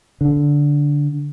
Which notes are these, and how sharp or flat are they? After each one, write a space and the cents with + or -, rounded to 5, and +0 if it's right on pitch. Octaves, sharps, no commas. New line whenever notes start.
D3 -10